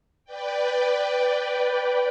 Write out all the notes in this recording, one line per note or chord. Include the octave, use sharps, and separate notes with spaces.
B4 D5 G5